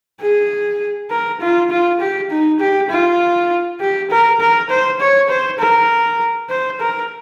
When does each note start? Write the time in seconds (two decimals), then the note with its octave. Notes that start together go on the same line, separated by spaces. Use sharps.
0.21 G#4
1.10 A#4
1.41 F4
1.70 F4
2.00 G4
2.31 D#4
2.60 G4
2.90 F4
3.80 G4
4.11 A#4
4.41 A#4
4.69 C5
5.00 C#5
5.29 C5
5.59 A#4
6.50 C5
6.80 A#4